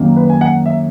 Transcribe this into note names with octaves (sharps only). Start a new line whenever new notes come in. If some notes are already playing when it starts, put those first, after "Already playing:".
Already playing: F#2 D#3 A#3
B4
G#5
F#5
E5